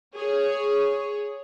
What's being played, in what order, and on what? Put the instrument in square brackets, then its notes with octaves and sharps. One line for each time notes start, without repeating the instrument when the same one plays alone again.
[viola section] G#4 C#5